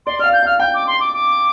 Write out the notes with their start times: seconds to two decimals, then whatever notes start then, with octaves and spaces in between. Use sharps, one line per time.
0.06 D5 C6
0.19 D5 F5 F6
0.33 G6
0.43 F5 F6
0.60 G5 G6
0.74 D6
0.87 C6
1.00 D6
1.13 D6